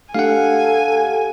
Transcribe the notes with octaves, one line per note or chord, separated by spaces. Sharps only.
A3 D4 G4 A4 F5 F#5 G#5